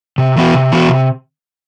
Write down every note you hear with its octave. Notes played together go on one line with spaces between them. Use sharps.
C3
E3 B3 F#4
C3
E3 B3 F#4
C3